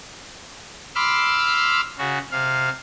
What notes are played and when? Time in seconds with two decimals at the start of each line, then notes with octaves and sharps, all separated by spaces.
0.95 B5 C6 D6 E6 F6
1.98 C#3 F#4
2.31 C3 F5